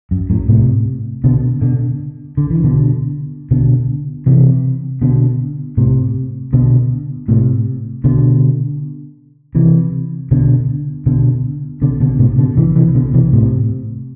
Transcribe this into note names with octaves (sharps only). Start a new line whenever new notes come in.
F#2
F#2 A2
A2 C3
B2 D3
B2 D3
D3
E3
B2 D3
B2 D3
C3 E3
B2 D3
A2 C3
B2 D3
A2 C3
B2 D3
C3 E3
B2 D3
B2 D3
B2 D3
B2 D3
A2 C3
B2 D3
C3 E3
C3 E3
B2 D3
C3 E3
A2 C3